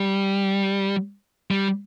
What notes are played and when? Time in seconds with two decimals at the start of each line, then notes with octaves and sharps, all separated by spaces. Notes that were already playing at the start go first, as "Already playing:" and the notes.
Already playing: G3
1.51 G3